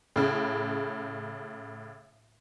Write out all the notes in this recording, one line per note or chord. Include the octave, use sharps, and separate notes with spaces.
A2 C#3